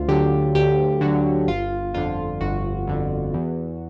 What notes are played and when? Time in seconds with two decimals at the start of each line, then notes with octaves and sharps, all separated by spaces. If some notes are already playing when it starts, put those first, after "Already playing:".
Already playing: D2 F4
0.08 D3 F#3 G4
0.55 D2 G4
1.01 D3 F#3 F#4
1.48 G1 F4
1.94 F2 D3 F4
2.41 G1 F#4
2.87 F2 D3
3.34 E2